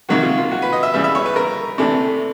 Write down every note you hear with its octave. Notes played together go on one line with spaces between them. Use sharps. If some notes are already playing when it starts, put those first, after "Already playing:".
C3 D#3 F#3 A#3 F#4
F4
F4
F#4
B4
D#5
E5
C#3 E3 G3 B3 E5
E5
C#5
B4
A#4
C3 E3 A3 D4